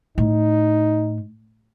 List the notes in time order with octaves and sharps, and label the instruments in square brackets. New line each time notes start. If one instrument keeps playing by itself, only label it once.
[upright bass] A2 [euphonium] D#4